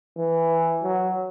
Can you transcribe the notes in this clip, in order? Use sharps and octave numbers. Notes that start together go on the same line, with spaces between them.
E3
F#3